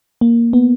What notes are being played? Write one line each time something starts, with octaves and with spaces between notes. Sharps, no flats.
A#3
B3